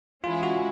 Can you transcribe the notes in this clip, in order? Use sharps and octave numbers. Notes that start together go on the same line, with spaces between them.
E3 G#3 C#4 E4 F4 G#4
F#4